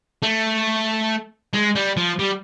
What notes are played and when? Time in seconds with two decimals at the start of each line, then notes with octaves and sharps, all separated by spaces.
0.23 A3
1.54 G#3
1.76 G3
1.97 F3
2.19 G3